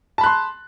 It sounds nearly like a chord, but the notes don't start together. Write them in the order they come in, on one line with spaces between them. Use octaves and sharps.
A5 B5 F#6 C6